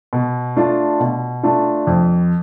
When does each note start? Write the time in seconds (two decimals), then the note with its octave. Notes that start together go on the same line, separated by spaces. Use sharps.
0.13 B2
0.56 A3 D4 F4
1.00 B2
1.43 A3 D4 F4
1.87 F2